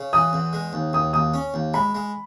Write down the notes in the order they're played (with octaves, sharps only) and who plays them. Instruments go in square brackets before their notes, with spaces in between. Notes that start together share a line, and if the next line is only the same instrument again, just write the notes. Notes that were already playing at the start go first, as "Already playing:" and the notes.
Already playing: [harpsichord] C#3
[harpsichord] E3 [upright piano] D#6
[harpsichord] E2
G#3
D#2
[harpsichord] D#2 [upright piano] D#6
[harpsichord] D#2 [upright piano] D#6
[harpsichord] C#4
D#2
[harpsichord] G#3 [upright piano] B5
[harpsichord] G#3